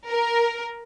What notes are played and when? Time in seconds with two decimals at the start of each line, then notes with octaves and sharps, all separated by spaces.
0.11 A#4